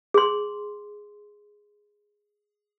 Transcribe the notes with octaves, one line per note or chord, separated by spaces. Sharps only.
G#4 C6